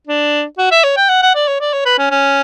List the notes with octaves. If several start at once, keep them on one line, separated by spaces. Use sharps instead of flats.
D4
F#4
E5
C#5
G5
F#5
F#5
D5
C#5
D5
C#5
B4
C#4
C#4